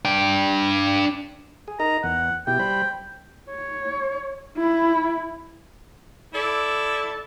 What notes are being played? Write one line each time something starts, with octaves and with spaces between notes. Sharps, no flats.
D4 G5
G#4
D#4 A#4 D#5 A#5
E2 F#5
B2 E4 G4 G5
G3 C5 B5
C#5
E4 B5
E4 A4 D5